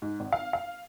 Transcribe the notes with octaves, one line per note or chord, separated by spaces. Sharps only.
G#2
G#1
F5
F5